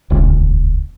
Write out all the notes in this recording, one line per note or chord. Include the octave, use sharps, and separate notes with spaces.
D#1 C#2 C#3